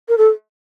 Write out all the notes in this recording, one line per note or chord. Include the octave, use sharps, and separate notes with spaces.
A#4
A4